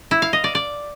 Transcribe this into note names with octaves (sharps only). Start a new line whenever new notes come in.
E4
F5
D#5
D5
D5